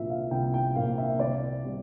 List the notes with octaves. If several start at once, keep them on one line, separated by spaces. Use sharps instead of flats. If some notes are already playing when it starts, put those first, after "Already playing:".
Already playing: C2 A#2 F3 A#3 E5
F5
C2 G5
G5
A#2 F3 A#3 F5
E5
C2 D5
C3 G3